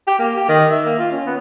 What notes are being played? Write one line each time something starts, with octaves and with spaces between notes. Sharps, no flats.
G4
A#3
G4
D#3
E5
A#3
F4
C#4
B3